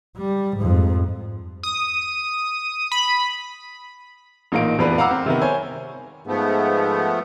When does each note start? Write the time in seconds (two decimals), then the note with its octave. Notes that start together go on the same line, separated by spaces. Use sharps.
0.17 G3
0.57 F2 G#2
1.63 D#6
2.92 B5
4.52 A1 A#2 D#4 F4 F5 D7
4.78 F1 E2 F3 B3 D4 B4
4.98 F5 F#5 A#5 D6 E6 F6
5.11 C4
5.26 C3 D#3 B3
5.42 C5 C#5 G#5
6.27 G#2 F3 A3 B3